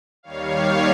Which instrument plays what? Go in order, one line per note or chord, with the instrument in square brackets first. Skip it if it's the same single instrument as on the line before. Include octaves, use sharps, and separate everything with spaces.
[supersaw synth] D#2 D#3 G3 C#5 F5